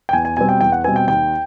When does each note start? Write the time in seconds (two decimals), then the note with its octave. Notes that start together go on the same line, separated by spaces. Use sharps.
0.09 G5
0.13 E2 G#5
0.25 G#5
0.37 B2 G3 C4 G#5
0.49 G5
0.61 E2 G5
0.72 F#5
0.84 B2 G3 C4 G#5
0.96 G5
1.08 D#2 G5